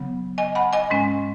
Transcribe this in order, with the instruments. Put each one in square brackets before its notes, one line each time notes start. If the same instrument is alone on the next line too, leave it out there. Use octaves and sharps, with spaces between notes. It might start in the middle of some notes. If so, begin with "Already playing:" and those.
Already playing: [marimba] C#3 F#3 B3
D#5 G#5
F#5 B5
D#5 G#5
G#2 G#3 C#4